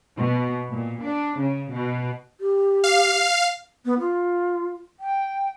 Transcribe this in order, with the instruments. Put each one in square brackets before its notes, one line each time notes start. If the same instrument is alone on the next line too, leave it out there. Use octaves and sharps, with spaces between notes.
[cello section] B2
A#2
D4
C#3
B2
[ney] G4
[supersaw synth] F5
[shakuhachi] B3
F4
G5